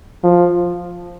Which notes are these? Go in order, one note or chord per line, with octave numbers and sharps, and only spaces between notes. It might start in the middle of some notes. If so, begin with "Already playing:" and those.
F3